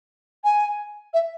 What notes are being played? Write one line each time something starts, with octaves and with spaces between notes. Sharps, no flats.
G#5
E5